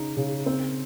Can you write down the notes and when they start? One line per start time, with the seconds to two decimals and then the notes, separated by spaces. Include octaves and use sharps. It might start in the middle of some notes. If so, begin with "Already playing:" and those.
Already playing: C#3 D#4
0.17 C#3
0.46 C4